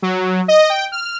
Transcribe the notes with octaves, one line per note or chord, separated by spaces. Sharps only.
F#3
D#5
G5
F6